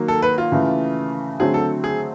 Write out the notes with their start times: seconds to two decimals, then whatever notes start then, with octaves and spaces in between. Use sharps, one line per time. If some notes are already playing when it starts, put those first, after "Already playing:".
Already playing: D#3 F#3 A#3
0.08 A4
0.22 B4
0.38 F4
0.52 C#3 E3 A3
1.40 D3 F#3 A3 C4 G#4
1.54 A4
1.84 G#4